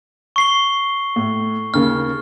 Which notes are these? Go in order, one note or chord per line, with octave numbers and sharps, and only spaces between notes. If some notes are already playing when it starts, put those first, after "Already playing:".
C#6 C7 G7
A2
D#2 C#3 A#3 F6